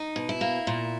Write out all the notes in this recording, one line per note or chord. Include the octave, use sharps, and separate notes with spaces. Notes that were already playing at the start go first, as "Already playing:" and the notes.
Already playing: D#4
B2
E4
A#3
A#2